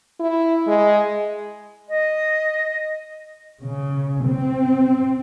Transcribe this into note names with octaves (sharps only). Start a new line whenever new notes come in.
E4
G#3
D#5
C#3
C4